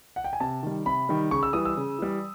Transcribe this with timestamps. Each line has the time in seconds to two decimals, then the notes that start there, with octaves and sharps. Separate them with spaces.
0.16 F#5
0.24 G5
0.33 G#5
0.40 C3 A5
0.63 D#3 G3
0.86 C3 B5
1.09 D#3 G3
1.31 C#3 C#6
1.43 E6
1.53 E3 G3 D#6
1.65 E6
1.77 C#3
1.98 E3 G3